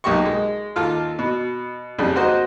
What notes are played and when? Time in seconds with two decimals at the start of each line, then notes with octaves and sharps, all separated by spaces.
0.04 B1 A#3 G4 D#5 C#6
0.25 G#3
0.76 D#2 F4 A4 F6
1.19 B2
1.99 F2 C#3 G3 D4
2.16 A#3 F#4 C5 D#5